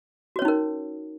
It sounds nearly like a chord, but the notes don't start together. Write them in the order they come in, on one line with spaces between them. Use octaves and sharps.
F#4 C#5 C#4 D#4 A#4